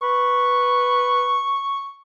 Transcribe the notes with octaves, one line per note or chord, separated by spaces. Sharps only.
B4 C#6